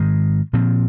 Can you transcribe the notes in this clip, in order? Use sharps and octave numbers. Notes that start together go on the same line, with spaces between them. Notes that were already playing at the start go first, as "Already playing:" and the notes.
Already playing: G#2 D#3 G#3
A#2 F3 C4